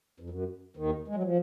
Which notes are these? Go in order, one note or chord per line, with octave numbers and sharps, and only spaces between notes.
F2
F#2
D#2 D#3
G#3
F#3
F3